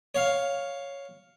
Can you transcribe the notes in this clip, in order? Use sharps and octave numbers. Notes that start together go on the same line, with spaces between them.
C#5 F5